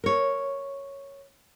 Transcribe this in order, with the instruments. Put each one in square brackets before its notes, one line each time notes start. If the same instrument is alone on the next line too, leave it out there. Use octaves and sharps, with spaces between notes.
[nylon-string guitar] A#4 C#5